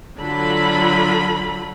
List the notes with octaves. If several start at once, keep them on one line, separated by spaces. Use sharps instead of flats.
D3 F#3 F4 A4 B5